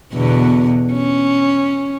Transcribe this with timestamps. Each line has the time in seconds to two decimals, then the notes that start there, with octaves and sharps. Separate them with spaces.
0.14 E2 B2 D3
0.93 C#4